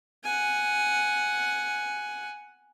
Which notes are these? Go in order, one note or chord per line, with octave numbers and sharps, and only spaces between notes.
F#5 G#5